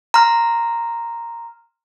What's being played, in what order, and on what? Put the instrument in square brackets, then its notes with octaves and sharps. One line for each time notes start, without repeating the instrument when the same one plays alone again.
[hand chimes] A#5 C6 F6